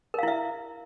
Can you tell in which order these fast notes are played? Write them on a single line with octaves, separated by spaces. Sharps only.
A#4 F5 E4 E5